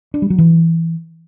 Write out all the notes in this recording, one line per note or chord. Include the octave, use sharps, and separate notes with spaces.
D4
G3
F#3
E3